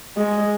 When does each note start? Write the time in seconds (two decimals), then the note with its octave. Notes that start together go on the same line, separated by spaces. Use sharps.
0.17 G#3